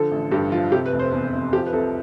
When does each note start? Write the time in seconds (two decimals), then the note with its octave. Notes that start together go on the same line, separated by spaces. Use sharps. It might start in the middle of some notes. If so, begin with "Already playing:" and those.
Already playing: D3 F3 A4
0.11 A1
0.32 G2 G4
0.52 F3 F4
0.72 C3 G4
0.86 B4
0.92 F1
0.99 C5
1.13 E2
1.33 F1
1.53 F3 G4
1.67 B4
1.73 C2 A4